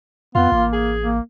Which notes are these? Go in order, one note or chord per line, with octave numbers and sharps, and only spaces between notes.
F2 B3 F4
A1 A#3
G#4
A#3